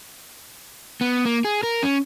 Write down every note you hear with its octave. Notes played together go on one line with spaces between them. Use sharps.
B3
A#3
G#4
A#4
C#4